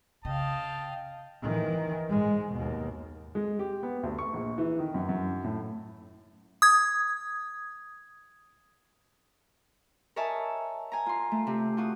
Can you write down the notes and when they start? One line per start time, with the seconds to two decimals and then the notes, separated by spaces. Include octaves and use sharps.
0.25 C#3 D#5 F5 G5 A5
1.42 D#3 E3
2.09 G#2 G#3
2.53 D#2 B2
3.35 G#3
3.59 G4
3.83 B3
4.03 D2
4.19 C#6
4.33 A#1
4.58 E3
4.79 D#3
4.94 F#2
5.09 F#2
5.44 A2
6.62 D#6 G#6
10.16 A#4 C#5 D#5 E5 G#5 A5
10.92 G#5 A#5
11.06 F4 C6
11.31 A3
11.47 C3
11.77 F4 F#4 D#6